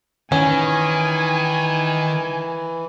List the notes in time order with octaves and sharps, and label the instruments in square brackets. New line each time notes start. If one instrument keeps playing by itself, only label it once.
[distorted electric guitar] D#3 [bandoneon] E3 [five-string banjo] C#4 [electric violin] G#5